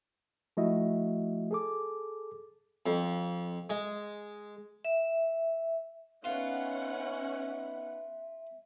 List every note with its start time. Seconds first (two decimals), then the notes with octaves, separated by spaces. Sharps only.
0.57 F3 A3 E4 F#4 D#5 E5
1.51 G#4 A4 D6
2.86 F2
3.70 G#3
4.84 E5
6.24 B3 C#4 D#4 F4 B4 E5 F#5